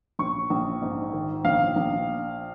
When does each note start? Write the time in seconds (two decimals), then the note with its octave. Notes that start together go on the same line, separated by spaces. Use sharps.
0.19 A#1 C#6
0.50 A#1
0.82 G#2
1.13 D#3
1.45 A#1 F5
1.76 A#1